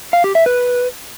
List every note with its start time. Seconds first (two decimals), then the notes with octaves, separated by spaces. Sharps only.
0.13 F5
0.24 G4
0.35 E5
0.46 B4